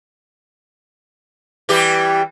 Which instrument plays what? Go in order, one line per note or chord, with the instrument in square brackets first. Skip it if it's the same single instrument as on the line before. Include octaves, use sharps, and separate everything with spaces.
[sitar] E3 G3 G4